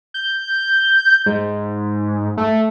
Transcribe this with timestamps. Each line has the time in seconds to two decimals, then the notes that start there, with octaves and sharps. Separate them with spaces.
0.14 G6
1.26 G#2
2.37 A3